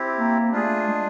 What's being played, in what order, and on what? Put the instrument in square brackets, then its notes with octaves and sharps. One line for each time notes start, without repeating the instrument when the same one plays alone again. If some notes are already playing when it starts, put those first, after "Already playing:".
Already playing: [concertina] C4 E4 G4
[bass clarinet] A#3
[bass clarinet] A3 [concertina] D4 F4 G#4
[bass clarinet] G#3